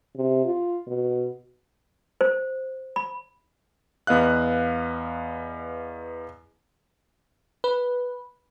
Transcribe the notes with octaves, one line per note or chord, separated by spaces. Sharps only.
C3
F4
B2
C5
B5
E2 B3 D#5 F5 F#6
B4